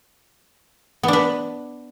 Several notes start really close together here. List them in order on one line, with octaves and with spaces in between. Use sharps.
B3 D4 B4